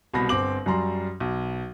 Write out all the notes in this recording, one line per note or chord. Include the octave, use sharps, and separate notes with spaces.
C2 B2 B5 A#6
G1 C4 D6 F#7
F#2 G3 A#5 C6
B1